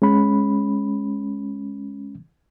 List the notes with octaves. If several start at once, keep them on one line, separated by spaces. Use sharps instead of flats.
G#3 C#4 B5